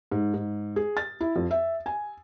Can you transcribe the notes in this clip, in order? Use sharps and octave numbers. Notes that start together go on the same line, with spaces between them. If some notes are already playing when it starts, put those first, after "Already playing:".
G#2
G#2
G#4
A6
E4
F2
E5
G#5